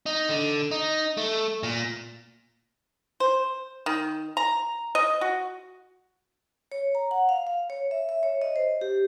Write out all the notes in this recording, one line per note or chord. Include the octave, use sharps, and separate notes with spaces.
D#4
D3
D#4
A3
A#2
C5
D#3
A#5
D#5
F#4
C#5
A#5
F#5
F5
F5
C#5
E5
E5
C#5
D#5
C5
G4